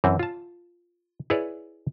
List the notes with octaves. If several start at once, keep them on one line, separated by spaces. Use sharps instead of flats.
F#2 E3 C4
F4 A5
E4 G#4 B4 C#5 D5